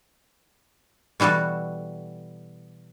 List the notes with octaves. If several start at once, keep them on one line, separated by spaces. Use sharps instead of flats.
B2 E3 G3 F#4 A4